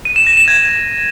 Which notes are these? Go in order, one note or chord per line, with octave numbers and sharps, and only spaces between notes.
D#7
E7
A#6
E7
G#6